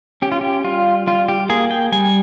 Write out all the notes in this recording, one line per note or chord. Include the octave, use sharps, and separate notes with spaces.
C#4 G4
F4
G4
G3 F4
G3 F4
G4
A#3 G#4
G5
G3 G#5